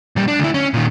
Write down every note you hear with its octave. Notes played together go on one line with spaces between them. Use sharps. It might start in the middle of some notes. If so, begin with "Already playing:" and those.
A#2 G3
D4
D2 E4
C#4
A#2 D#3